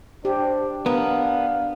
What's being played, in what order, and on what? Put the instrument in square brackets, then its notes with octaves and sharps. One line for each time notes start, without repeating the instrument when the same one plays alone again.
[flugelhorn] D4 [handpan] G4 [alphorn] C5
[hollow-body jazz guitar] B3 A#4 [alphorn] D4 [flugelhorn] F5